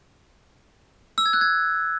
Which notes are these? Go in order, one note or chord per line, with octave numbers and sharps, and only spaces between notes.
E6
G#6
F#6
G#6